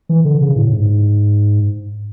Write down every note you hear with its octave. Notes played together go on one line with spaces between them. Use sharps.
E3
D3
C#3
A2
G#2